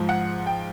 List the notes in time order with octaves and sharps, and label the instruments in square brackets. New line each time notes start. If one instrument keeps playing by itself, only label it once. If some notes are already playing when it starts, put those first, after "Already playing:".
Already playing: [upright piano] G#2 F3
F#5
G5